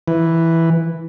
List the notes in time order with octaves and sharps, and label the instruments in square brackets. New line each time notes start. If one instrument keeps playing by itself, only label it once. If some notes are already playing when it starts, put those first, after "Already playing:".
[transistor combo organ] E3